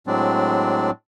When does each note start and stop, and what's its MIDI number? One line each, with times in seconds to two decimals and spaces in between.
0.07 0.91 45
0.07 0.91 54
0.07 0.91 56
0.07 0.91 60
0.07 0.91 62
0.07 0.91 74